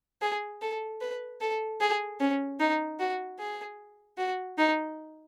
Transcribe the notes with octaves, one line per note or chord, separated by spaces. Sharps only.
G#4
A4
B4
A4
G#4
C#4
D#4
F#4
G#4
F#4
D#4